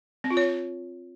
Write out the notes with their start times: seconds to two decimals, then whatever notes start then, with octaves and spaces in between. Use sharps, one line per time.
0.24 C4
0.31 F4
0.37 C#5